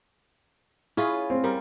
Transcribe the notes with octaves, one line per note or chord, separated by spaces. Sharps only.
C#4 E4 F4 G#4 B4
C4
G3 A#4